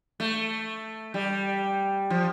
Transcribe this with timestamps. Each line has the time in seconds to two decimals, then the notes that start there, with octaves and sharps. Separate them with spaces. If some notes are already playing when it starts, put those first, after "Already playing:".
0.20 A3
1.14 G3
2.10 F3